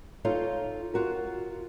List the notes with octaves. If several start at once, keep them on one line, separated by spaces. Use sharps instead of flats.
D#4 F4 A4 C#5 F5
F4 F#4 A#4